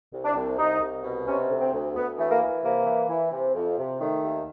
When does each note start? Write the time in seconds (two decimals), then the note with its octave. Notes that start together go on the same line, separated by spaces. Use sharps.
0.12 C2
0.24 D4
0.35 C2
0.58 C2 D#4
0.80 C2
1.03 B2
1.26 C3 C#4
1.49 D2
1.60 C4
1.72 D2
1.94 D2 B3
2.17 E3 A3
2.29 A#3
2.41 E3
2.63 C3 A#3
2.85 E3
3.09 E3
3.32 C3
3.54 F2
3.77 C3
4.00 D#3 A3
4.23 D#2